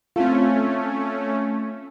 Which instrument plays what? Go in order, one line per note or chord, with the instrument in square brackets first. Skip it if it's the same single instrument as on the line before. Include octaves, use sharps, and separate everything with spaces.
[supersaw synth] A3 C#4 [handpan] C4 F4